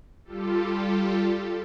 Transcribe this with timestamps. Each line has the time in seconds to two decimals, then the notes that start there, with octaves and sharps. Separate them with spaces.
0.25 G3 F4 G4 A4